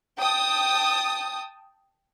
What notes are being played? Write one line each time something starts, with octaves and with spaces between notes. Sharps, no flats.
G5 A5 D#6